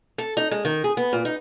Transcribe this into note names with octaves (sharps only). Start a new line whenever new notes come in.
A4
D#4
G#3
D#3
G#4
B3
A#2
D#4